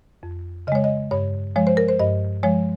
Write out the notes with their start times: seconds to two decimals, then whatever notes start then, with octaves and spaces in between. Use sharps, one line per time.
0.23 F2
0.67 C#3 D#5
0.72 G#3 C#5
0.84 D#5
1.11 G2 C#5
1.56 F3 G#3 C#5
1.67 C5
1.77 A#4
1.88 C5
1.99 G2 D#5
2.43 F3 G#3 C#5